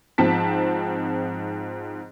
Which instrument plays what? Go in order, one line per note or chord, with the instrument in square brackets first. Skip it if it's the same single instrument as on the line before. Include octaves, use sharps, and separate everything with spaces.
[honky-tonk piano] G#2 F3 C4 A5 B6